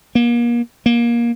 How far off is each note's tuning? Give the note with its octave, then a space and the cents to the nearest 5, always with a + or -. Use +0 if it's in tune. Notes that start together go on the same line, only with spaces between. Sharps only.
A#3 +35
A#3 +20